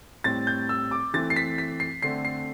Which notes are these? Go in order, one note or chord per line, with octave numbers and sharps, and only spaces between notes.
A2 G3 C4 A6
G6
E6
D6
E3 A3 C4 A6
C7
B6
B6
C7
D3 A3 C4 C7
C7